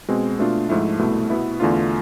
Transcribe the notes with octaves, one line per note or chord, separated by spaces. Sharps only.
B2 G#3 C4
B2 A3 D4 F4
G#2 F3 A3 E4
C2 B2 A3 E4
B2 B3 E4
E2 D3 A3 D4 F4